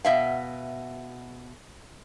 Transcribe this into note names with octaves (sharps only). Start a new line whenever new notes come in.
B2 E5 F5